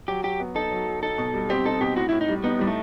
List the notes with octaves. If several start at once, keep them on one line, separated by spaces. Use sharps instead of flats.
F#3 G4
F#3 G4
B3
D#4 A4
F#3
F#3
D#4 A4
B2
G3
C4 G4
D#4 A4
B2 G4
A2 F#4
A2 E4
D#4
G3
B3 D#4
A2 G3
A3